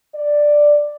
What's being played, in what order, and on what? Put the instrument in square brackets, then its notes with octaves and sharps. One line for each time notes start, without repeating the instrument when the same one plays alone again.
[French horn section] D5